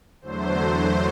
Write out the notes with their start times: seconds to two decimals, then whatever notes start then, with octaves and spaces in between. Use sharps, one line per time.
0.21 E2 D3 F#3 A3 C5